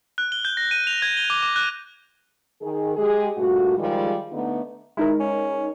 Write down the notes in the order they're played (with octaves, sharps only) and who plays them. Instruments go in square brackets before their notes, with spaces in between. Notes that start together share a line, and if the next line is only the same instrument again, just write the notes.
[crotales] F#6
G7
G6
A#6
D#7
F7
G#6
G7
D6
D6
F#6
[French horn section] D#3 G#4
G#3 G4 G#4
G2 A#2 A3 F#4
D#3 F3 G3 G#3
D3 A3 B3 D4 D#4
[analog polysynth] G#3 D#4 A#4 [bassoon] E4
[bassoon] C#4